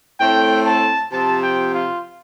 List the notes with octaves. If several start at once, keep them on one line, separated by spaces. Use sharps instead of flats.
A2 A3 C4 G5
A5
C3 F3 C4 A5
G5
F4